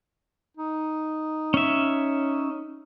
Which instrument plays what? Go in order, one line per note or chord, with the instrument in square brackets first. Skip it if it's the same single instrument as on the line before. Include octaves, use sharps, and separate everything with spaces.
[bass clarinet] D#4
[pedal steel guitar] C#4 E5